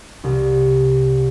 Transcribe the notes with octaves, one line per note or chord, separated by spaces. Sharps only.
C2